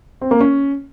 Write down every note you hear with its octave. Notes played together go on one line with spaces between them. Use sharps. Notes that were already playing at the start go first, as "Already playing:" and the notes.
C4
A#3
C#4